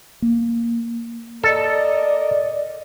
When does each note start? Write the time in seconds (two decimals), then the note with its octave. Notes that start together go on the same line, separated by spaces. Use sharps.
0.22 A#3
1.44 A4 A#4 D5 D#5